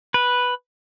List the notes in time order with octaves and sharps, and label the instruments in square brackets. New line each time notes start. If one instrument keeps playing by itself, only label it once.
[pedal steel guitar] B4